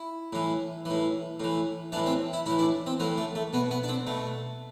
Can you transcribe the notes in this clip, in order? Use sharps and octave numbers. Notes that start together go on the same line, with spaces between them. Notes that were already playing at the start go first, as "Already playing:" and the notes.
Already playing: E4
A2 E3
A2 E3
A2 E3
A2 E3 D4
C4
E4
A2 E3 E4
D4
C4
A2 E3 B3
A3
A3
B2 B3
B3
D4
C4
B2 A3